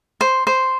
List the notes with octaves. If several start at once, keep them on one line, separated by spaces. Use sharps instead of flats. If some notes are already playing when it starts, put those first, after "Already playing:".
C5
C5